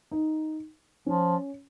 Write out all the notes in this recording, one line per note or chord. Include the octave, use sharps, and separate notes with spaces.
D#4
F3 C#4